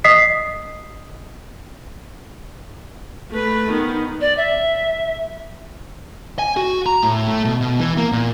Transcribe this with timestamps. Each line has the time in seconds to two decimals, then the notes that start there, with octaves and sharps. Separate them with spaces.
0.04 D#5 D#6 B6 C7
3.31 A3 B4
3.71 D#3 B3
4.21 D5
4.37 E5
6.39 G#5
6.57 F#4
6.86 A#5
7.03 A2
7.27 A3
7.45 B2
7.61 B2
7.79 E3
7.98 A#3
8.12 A#2